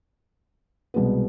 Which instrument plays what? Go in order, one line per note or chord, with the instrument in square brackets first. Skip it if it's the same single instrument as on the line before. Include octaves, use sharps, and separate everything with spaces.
[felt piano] C2 B2 G#3 B3